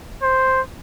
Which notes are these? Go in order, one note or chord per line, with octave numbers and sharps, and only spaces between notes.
C5